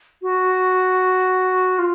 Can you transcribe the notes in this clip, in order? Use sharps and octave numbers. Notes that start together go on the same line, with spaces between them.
F#4
F4